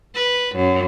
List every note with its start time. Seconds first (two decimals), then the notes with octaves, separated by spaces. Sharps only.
0.15 B4
0.56 F#2